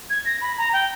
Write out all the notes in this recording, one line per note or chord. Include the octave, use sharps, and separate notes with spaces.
G#6
A#6
B5
A#5
G5